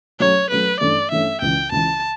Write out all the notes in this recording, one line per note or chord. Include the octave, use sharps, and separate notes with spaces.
F#3 A3 C#4 C#5
F#3 A3 C#4 B4
G2 E3 A3 C#4 D5
G2 E3 A3 C#4 E5
C#2 C#3 E3 G5
C#2 C#3 E3 A5